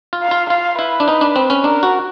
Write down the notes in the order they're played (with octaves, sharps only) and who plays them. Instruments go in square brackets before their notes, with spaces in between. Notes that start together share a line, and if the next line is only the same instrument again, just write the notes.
[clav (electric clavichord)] F4
[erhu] F5
[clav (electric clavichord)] F4
[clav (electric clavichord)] F4 [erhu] F5
[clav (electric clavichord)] E4 [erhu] B4
[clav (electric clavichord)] D4
D#4
D4
C4
C#4
[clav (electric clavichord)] D4 [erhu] A#4
[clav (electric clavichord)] F#4